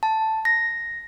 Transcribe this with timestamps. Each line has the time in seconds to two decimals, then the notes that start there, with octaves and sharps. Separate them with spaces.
0.03 A5
0.45 A#6